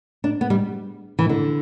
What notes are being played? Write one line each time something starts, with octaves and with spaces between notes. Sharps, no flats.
D4
B3
G3
E3
D3